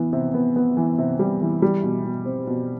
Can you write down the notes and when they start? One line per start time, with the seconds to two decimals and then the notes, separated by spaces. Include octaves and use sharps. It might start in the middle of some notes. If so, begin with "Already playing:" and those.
Already playing: E3 B3
0.13 C3
0.34 B3
0.56 B3
0.77 E3
0.98 C3
1.19 G3
1.41 E3
1.62 G3
1.83 B2
2.05 B2
2.25 C4
2.47 B2